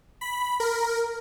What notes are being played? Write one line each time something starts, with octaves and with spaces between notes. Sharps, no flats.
B5
A#4